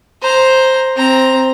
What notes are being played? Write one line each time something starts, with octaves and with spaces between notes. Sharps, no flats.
C5 A#5
C4 A#5